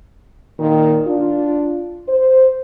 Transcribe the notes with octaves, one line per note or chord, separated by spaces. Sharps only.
A#2 D#3
D4 F4
C5